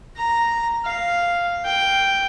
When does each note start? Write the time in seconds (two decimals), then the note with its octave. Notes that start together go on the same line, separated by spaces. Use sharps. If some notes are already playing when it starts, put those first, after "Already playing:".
0.17 A#5
0.85 F5
1.65 G5